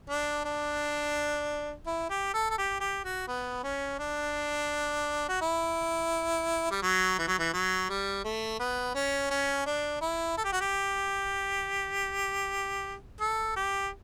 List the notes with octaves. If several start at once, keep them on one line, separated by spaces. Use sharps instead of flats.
D4
D4
E4
G4
A4
A4
G4
G4
F#4
B3
C#4
D4
F#4
E4
G3
F#3
E3
F#3
E3
F#3
G3
A3
B3
C#4
C#4
D4
E4
A4
G4
F#4
G4
A4
G4